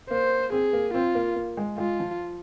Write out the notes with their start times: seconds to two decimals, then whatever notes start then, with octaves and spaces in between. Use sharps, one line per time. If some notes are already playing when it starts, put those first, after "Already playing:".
0.10 A#3 C5
0.52 C4 G#4
0.73 A#3
0.94 C4 F4
1.15 A#3
1.36 A#3
1.57 G#3
1.78 G#3 F4
2.00 F3